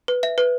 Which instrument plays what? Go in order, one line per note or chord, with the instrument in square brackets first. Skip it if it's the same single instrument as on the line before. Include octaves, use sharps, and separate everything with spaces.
[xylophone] B4
E5
B4